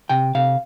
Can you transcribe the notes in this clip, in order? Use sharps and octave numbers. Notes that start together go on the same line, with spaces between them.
C3 G5
C3 F5